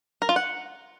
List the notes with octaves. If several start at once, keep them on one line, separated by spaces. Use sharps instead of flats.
A#4
F4
F#5